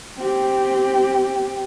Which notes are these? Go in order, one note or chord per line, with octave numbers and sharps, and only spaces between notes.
C4 G4